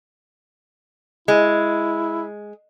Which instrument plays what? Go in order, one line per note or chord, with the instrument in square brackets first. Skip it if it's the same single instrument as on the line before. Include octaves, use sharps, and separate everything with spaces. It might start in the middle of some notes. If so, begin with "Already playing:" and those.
[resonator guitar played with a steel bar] G#3 [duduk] E4